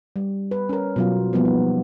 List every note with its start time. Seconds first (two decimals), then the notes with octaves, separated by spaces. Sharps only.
0.16 G3
0.51 B4
0.69 C#4 A#4
0.96 B2 F#3 F4
1.33 F3 G3 A#3 B3
1.45 D#4